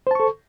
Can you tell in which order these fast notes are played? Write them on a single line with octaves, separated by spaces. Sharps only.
C5 A5 C#6 A4